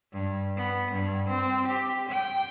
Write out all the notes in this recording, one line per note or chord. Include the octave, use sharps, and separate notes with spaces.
G2
B3
G2
C4
G4
G5